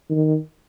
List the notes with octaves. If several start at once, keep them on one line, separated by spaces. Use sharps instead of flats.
D#3